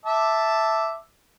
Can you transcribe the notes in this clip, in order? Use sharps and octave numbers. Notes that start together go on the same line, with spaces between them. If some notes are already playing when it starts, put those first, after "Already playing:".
E5 A5 D6